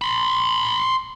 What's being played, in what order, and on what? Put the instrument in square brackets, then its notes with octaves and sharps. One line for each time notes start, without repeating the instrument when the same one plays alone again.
[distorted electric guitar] B5 C6